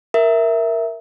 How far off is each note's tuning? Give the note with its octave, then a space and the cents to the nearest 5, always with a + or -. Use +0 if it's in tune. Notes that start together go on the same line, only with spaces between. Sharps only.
A#4 +0 E5 +0